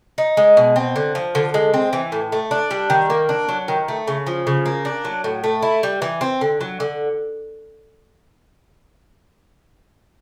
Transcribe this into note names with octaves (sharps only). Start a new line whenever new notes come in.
D#4
G#3
B2
C4
D3
F3
D3
G#3
C4
E3
A2
A3
D4
G3
D#3
A#3
D4
F#3
D#3
A3
C#3
F3
C#3
A#3
D4
F#3
A2
A3
E4
G3
E3
C4
D3
F#3
D3